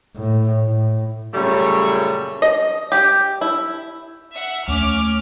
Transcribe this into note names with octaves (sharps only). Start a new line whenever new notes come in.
A2
A2
F#2 A#2 C#3 G3 A3 C#5
D#5
G4
E4
E5 F#5
D#2 A3 C#4 D6 F6